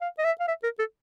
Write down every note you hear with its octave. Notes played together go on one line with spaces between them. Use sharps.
F5
D#5
E5
F5
E5
A#4
A4